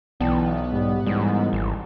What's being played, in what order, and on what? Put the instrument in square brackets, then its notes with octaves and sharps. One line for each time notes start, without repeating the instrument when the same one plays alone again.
[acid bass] B1 [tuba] E3 [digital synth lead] B3 [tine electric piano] D5 G5 A5
[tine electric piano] G#2 [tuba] G3
[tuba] A1 [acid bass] G#2 [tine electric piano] G3
[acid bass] G#1